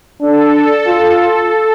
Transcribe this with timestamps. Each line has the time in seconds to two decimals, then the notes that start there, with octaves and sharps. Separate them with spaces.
0.22 D4 A4
0.87 F4